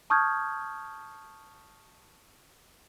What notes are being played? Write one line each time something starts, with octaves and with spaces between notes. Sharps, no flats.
A5 C#6 D#6 F6 G6 G#6